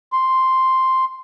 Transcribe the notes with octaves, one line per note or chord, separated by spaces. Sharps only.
C6